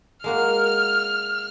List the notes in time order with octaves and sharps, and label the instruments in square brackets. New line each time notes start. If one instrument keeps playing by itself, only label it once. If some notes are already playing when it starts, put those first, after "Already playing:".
[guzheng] G#3 A#3 F#4 [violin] F6